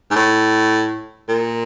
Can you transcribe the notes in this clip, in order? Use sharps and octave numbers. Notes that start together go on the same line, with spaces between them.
G#2
A2
A#2